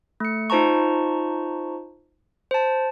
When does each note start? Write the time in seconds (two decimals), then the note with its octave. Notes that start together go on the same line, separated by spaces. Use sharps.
0.20 A3 C#7
0.50 D#4 F4 C5 A5 A#5 C#6
2.51 C5 A5